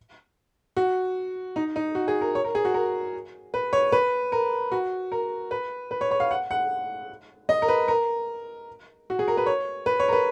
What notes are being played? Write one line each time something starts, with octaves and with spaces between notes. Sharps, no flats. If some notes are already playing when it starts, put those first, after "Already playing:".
F#4
D#4
D#4
F#4
G#4
A#4
C#5
A#4
G#4
F#4
A#4
B4
C#5
B4
A#4
F#4
A#4
B4
B4
C#5
C#5
F5
F#5
F#5
D#5
A#4
B4
A#4
F#4
G#4
A#4
B4
C#5
B4
C#5
A#4
B4